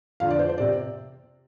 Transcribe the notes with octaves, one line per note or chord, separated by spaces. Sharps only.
F2 D3 F3 F5
D5
C5
C5
C3 D5